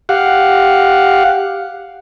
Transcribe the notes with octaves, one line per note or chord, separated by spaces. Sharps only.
G4 F5 F#5